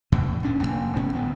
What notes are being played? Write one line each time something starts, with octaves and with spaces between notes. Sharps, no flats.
E2 A2 C3
B1 A#2 C#4 D4
F1 F#2 A#3
A1 G#2 B3 C#4
G1 D2 B3